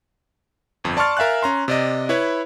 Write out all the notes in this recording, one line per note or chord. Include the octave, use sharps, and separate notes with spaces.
G1 F2
D5 A5 C6 C#6 F6 A6
A#4 E5 F5 G#5 F#6
C#4 A#5 C6
C3 D5 D#5
E4 B4 C#5